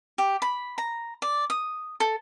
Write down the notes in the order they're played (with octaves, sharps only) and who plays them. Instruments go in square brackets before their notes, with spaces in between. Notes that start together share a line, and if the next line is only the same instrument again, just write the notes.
[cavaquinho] G4
B5
A#5
D5
D#6
A4